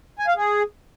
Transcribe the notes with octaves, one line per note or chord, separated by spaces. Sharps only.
G#5
F5
G#4